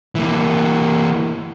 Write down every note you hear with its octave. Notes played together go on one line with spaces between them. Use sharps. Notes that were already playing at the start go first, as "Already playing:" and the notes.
E3 A#3